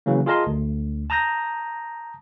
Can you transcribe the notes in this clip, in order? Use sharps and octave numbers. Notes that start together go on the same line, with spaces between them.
C#3 E3 F#3 A#3
F4 G#4 A#4 D#5 A5 C6
D2
A5 A#5 D#6 G6 A#6